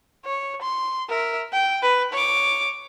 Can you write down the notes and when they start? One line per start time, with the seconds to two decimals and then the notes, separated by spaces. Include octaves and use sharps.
0.25 C#5
0.62 C6
1.09 A#4 E5
1.53 G5
1.83 B4
2.13 C#5 D6